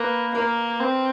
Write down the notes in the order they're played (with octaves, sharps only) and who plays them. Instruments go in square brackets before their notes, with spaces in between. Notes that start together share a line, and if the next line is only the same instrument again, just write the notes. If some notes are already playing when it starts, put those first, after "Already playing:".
Already playing: [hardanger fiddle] A#3 [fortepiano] B4
[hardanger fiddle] A#3 [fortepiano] A#4
[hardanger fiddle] C4